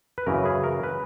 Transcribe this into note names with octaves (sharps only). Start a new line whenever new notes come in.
B4
F#2 C#3 E3 A#4
G#4
A#4
B4